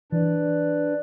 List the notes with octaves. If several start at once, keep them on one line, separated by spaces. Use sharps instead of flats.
E3 D4 B4 D5